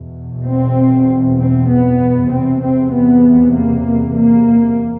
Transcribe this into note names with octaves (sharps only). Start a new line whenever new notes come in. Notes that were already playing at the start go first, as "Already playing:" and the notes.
Already playing: E2 B2
C4
C4
B3
E2 C3 C4
C4
B3
A#3
A#3